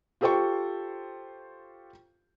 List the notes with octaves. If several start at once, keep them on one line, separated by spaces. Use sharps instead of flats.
F4 G4 A4 C5 G5 C#6